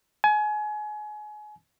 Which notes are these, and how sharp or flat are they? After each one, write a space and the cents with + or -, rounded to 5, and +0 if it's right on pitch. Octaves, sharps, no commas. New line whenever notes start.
G#5 +30